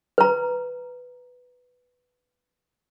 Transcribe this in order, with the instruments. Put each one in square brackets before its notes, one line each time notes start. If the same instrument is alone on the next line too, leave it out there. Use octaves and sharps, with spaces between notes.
[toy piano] B4 A#5